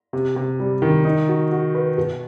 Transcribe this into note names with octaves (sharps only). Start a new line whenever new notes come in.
C3
C3
G3
D#3
D#4
F#4
F#4
B4
B2